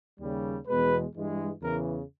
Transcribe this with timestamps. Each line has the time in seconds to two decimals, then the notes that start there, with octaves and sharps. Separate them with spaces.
0.20 D#2 C#3 G3
0.67 E2 B2 G#3 B4
1.14 G2 E3 G#3
1.62 E2 C#3 E3 A#4